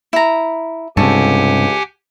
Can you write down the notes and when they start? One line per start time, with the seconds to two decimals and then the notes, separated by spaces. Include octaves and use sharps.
0.13 E4 A#5
0.97 C#2 G2 C3 G4 A4 F#5 G#5 C#6